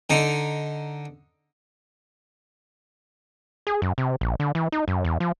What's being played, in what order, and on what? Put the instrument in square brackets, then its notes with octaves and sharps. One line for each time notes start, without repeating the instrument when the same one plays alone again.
[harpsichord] D3 D#4
[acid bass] G#4
F#2
C3
A#1
D3
E3
D#4
F#2
E2
F3